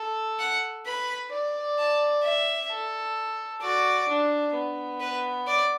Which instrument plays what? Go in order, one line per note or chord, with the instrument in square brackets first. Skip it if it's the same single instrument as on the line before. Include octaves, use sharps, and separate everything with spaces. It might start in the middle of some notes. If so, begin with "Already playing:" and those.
Already playing: [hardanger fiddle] A4
[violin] F#5
[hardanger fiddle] B4 [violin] B5
[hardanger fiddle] D5
[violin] A5
E5
[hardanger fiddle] A4
[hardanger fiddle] F#4 [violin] D5
[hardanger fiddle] D4
B3
[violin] B4
D5